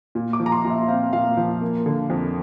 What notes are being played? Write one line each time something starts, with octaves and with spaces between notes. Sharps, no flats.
A#2
D6
F3
A#5
C6
A#2
E5
C4 F5
A#2 F5
F3
A#3
D3
F2